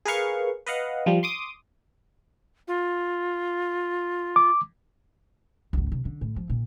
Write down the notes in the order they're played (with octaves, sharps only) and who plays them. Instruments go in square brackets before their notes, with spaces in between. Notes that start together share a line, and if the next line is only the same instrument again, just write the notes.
[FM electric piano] G#4 A#4 B4 F5 C#6
B4 D#5 F5 F#5
F3 G3
C6 D6 D#6
[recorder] F4
[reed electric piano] D6
[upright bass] G#1 C#2
C3
D3
A2
F3
A#2